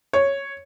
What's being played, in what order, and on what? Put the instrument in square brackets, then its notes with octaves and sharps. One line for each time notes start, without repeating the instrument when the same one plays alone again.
[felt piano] C#5